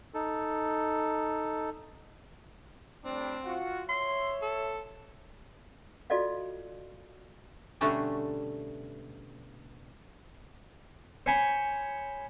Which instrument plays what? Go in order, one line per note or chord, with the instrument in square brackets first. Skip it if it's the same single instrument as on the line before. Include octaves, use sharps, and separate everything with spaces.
[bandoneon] D#4 A4
[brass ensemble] A2 G3 D4 [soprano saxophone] C4
[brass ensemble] F4 F#4
[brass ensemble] C#5 E5 [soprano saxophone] C6
[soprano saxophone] A4
[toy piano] F4 F#4 A4 D5 D#5 F5
[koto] B2 D3 G3 A3 C#4 D4
[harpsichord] C5 C#5 G#5 B5